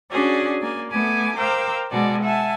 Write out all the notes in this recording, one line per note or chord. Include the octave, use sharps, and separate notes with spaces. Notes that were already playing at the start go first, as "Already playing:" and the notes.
C#4 D4 F#4 G#4 D5
A#3 D5 G#5
A3 B3 G#5 D6
A#4 C5 F5 G5 D6 E6
B2 G#3 F#4 D5 G#5 A5
E5 F#5 G#5 A5